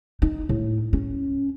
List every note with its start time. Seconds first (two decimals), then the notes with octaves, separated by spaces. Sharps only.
0.22 D#4
0.49 A2
0.93 C#4